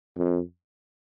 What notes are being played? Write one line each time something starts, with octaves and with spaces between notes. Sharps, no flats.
F2